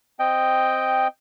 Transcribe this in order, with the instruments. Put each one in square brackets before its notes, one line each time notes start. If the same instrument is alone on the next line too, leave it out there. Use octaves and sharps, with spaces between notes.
[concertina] C4 D#5 G5